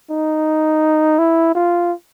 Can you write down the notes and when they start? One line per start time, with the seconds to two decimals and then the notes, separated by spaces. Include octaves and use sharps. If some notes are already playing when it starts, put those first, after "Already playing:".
0.11 D#4
1.19 E4
1.55 F4